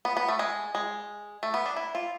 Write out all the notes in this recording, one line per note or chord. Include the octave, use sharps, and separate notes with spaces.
B3
B3
A3
G#3
G#3
A3
B3
D4
E4
F4